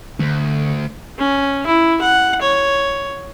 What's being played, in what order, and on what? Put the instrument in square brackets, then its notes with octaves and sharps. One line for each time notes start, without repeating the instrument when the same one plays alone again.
[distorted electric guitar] D2 [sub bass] D3
[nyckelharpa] C#4
E4
F#5
C#5